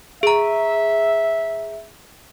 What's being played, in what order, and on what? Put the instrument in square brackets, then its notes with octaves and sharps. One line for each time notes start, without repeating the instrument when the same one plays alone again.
[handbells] G#4 A#5 [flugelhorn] E5